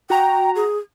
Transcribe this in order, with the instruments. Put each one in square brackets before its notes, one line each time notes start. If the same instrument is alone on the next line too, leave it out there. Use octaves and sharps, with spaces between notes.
[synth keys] F#4 A#5 [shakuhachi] G5
[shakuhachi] G#4